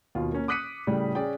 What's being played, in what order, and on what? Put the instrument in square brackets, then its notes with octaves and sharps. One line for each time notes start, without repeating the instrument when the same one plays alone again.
[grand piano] D#2 B2 F4
A#3 C#4
D6 D#6 F#6 B6 C#7 D#7
A2 C#3 G3
C#4 G#4 D5 G5